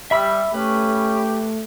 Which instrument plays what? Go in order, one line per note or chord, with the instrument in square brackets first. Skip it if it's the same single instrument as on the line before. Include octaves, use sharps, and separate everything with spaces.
[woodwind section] G3 [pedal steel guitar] E5 B5 E6
[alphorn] A3 [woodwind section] C#4 [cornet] G4 [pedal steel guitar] B4